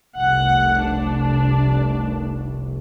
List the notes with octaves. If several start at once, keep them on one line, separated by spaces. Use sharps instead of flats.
F1 C2 F#5
D4